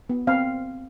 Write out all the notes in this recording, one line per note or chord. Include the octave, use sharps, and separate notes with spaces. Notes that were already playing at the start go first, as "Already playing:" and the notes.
B3
C4 F5